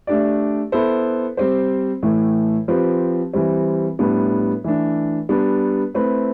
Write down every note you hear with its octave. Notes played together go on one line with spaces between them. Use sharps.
A3 D4 G4 D5
B3 E4 A4 C5
G3 C4 G4 C5
A2 E3 A3
F3 C4 G4 B4
E3 G3 C4
A2 G3 B3 D4
E3 A3 D4
G3 B3 D4
A3 C4 E4 B4